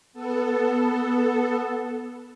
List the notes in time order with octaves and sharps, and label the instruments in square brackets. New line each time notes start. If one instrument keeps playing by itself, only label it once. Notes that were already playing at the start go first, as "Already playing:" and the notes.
[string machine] B3 A4